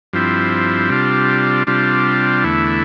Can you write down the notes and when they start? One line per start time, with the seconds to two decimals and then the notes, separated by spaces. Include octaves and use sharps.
0.13 G2 F3 C4 E4
0.90 C3 G3 D4 F4
1.67 C3 G3 D4 F4
2.44 E2 D3 A3 E4